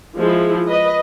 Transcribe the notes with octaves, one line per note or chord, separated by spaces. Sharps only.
F3 G#3 E4
B4 D#5